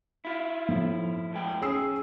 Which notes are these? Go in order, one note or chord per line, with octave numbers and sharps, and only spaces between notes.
E4 F4
A2 F3
E2 G#3 G5
C#4 G#4 E6 C7